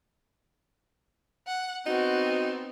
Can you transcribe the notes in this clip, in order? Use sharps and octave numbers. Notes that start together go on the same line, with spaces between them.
F#5
B3 C4 D#4 F#4